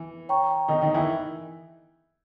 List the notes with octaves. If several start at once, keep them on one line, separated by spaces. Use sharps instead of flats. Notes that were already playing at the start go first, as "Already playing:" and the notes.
Already playing: E3
C#5 G5 A#5 C#6
D#3 D#4
D#3 D#4
E3 E4